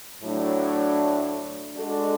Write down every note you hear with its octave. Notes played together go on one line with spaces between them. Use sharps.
A2 F#3 A3 D4
G#3 D4 F#4 A4